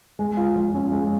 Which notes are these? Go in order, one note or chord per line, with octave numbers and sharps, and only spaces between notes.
G#3
F4
F3
C#4
G#3